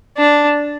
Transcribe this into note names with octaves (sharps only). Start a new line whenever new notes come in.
D4